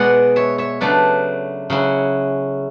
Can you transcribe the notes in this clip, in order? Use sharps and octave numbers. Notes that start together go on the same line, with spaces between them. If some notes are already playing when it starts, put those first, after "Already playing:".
Already playing: B2 G#3 B3 D5 F#5
C#5 E5
C#5 E5
C#3 F#3 A3 D4 B4 D5
C#3 F#3 C#4 E4